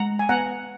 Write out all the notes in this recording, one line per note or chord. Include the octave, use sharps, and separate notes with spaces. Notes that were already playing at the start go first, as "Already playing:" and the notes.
Already playing: G#3 F#5 A#5
G#5
B3 F#5 A#5